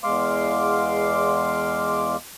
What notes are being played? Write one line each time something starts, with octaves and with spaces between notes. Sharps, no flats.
E2 G#3 F5 C6 D6